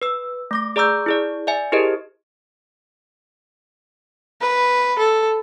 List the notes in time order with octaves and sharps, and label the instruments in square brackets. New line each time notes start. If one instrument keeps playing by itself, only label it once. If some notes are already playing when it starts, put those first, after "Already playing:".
[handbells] B4 E6
A3 D6 A#6
G#4 D5 A#5 D6 E6 G6
E4 G#4 D5
D5 E5 G#5
E4 G4 G#4 A#4 C5 D#5
[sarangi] B4
A4